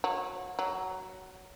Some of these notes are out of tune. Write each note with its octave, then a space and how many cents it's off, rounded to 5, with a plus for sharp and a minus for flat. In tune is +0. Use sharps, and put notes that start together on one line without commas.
F#3 -25
F#3 +15